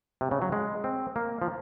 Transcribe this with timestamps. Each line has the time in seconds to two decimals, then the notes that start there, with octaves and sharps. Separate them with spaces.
0.21 C3
0.31 C#3
0.42 F#3
0.52 G#3
0.84 C4
1.16 A#3
1.42 F3